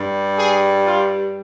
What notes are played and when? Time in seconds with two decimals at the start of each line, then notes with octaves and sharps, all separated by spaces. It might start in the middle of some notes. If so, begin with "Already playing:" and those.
Already playing: G2 G3
0.38 G#4
0.85 F4